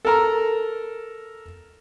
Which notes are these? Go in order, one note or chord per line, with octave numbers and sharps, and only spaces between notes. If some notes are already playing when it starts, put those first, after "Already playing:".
A4 A#4 A#5